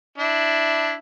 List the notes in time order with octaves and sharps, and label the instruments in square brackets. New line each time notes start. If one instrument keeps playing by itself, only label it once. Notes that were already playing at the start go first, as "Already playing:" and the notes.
[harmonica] D4 E4